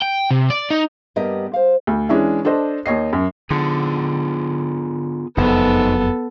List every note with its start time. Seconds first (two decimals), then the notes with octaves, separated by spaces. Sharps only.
0.02 G5
0.31 C3
0.50 D5
0.70 D#4
1.16 G2 G3 A#3 B3 G4 D#5
1.54 C5 F5
1.87 D2
2.09 E3 G#3 C#4 D4 E4
2.45 D4 A4 C5 D#5
2.86 D#2 C#5 D#5 C7
3.13 F#2
3.50 D3 B3 F4 G#4
5.37 F#1 F2 B3 D#4 A4 C5 D#5